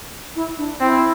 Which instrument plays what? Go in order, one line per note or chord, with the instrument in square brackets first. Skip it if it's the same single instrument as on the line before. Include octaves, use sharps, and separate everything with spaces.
[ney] E4
D4
[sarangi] C4 [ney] E4